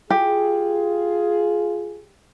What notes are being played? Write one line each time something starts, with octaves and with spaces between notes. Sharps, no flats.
F4 G4 G#4